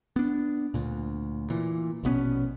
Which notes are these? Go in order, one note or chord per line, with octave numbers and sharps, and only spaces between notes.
B3 D4
D2 A#2
A#2 E3
A#1 B2 B3 C#4